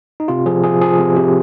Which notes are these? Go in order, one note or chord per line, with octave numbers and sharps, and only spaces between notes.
D#4
C3 F4
F3 G#4
F3 G#4
F3 G#4
C3
C3 G4